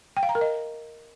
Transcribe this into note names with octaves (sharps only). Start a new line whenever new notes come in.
G5
F5
A#5
A#4
D#5